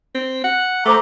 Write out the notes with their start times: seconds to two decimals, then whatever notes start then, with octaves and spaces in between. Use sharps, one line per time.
0.15 C4
0.44 F#5
0.85 A3 C5 A#5 D6